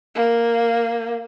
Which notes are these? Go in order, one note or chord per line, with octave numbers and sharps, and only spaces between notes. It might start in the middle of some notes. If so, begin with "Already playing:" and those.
A#3